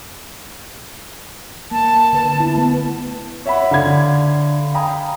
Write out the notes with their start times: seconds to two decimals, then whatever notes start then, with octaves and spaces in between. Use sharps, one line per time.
1.71 A#3 A5
2.13 D3 B4
2.37 B3 E4
2.56 A3 B3 E4
3.46 C#5 E5 F#5 B5
3.71 D3 F5 B5 G#6
4.74 F5 G5 G#5 A#5 B5 D#6